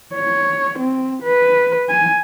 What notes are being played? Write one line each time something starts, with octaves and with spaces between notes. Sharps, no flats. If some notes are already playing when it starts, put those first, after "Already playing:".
C#5
C4
B4
G#5